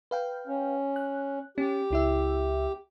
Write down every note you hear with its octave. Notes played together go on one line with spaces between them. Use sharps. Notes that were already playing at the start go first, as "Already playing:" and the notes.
B4 F5 G5
C#4
F#6
C#4 G4
C#2 E4 E5